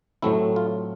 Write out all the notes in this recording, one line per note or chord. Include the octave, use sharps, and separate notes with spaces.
A2 F#3 A3 C4 E4
F4